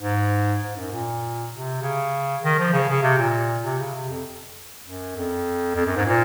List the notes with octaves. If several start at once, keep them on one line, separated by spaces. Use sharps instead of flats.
G#2
G#2
F#2
A#2
C3
C#3
D#3
F3
C#3
C#3
C3
A#2
C3
C#3
C3
F2
F#2
F2
F2
F#2
G#2
A#2